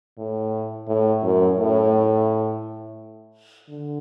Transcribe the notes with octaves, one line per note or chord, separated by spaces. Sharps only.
A2
A2
F#2
A2
D3